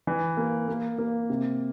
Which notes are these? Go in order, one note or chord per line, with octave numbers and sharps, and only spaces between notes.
E3
A#3
A#3
A#3
C3